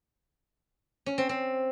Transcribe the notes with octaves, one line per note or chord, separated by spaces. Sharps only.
C#4
C4
C4